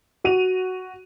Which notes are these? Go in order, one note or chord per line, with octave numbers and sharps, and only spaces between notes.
F#4 D#7 F7